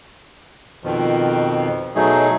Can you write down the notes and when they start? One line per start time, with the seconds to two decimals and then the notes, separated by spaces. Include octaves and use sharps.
0.84 F2 B2 D#3 F3
1.95 B2 F#3 A3 D#4 G#4